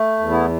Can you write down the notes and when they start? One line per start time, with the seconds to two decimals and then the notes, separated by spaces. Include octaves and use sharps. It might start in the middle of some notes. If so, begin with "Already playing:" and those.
Already playing: A3
0.19 E2
0.30 B3 E4